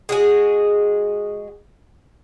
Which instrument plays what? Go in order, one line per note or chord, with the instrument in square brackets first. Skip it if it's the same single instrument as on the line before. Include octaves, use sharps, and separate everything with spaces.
[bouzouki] G#3 F#4 G#4